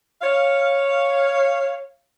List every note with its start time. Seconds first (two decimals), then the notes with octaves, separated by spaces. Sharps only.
0.22 C#5 F5